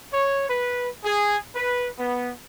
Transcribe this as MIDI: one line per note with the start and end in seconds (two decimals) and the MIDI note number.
0.13 0.44 73
0.47 0.87 71
1.04 1.36 68
1.54 1.87 71
1.98 2.30 59